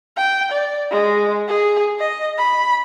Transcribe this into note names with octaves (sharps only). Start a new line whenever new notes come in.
G5
D5
G#3
G#4
D#5
B5